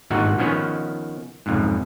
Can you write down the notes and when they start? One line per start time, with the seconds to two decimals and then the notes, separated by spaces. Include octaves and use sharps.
0.10 G#1 G2 A#2 D#4 F#4 F#5
0.38 D#3 F3 B3 C#4 B4 C#5
1.46 B1 F2 G#2